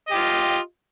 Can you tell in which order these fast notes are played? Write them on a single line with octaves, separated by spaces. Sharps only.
D#5 G4 F4